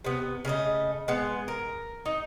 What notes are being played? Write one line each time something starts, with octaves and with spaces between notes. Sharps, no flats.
C3 B3
C#3 A3 A#4 D#5
G#3 B3
A#4
D#4